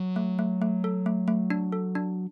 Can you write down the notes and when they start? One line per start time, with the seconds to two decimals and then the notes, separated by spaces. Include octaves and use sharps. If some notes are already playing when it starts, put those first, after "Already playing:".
Already playing: F#3
0.16 A3
0.39 A3
0.62 A3
0.84 A4
1.06 A3
1.28 A3
1.50 D4
1.72 A4
1.95 D4